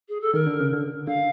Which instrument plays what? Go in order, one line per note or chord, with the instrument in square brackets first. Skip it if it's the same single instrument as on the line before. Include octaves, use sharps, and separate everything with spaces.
[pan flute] G#4
A4
[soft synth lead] D#3 [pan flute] A#4
[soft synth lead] D3
C#3
D3
[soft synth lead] D3 [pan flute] F5